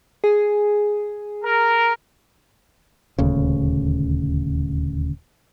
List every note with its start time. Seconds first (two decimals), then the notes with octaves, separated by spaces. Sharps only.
0.24 G#4
1.44 A#4
3.18 D#1 D2 C#3